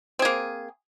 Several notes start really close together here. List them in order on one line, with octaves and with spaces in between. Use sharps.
C4 G#4 A#3